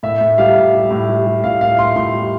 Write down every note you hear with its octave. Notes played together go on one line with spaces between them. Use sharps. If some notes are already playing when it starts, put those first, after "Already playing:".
A2 E5
A2
G3 F5
A2
G3
A2
G3
G3
A2 F5
A2 F5
A2 C6
A2 C6
G3